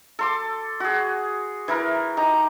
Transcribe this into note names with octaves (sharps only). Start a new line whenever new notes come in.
A4 C6 D6
F#4 G#4
E3 E4 A#4
D#4 G4 A#5